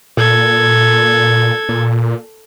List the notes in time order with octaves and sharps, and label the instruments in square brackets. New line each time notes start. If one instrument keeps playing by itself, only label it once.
[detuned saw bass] A#2 [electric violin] A4 G#6
[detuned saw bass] A#2